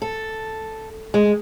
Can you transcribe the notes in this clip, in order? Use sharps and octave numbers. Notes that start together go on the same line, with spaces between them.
A4
G#3